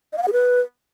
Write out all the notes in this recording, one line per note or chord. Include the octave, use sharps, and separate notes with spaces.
D#5
F5
F#5
G#4
B4